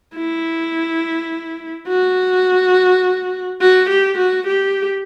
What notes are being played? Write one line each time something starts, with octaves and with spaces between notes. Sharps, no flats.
E4
F#4
F#4
G4
F#4
G4